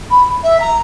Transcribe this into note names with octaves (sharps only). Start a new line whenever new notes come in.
B5
E5
A#5